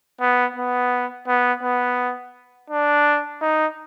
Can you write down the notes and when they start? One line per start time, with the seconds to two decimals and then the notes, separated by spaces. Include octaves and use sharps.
0.21 B3
0.56 B3
1.28 B3
1.63 B3
2.70 D4
3.41 D#4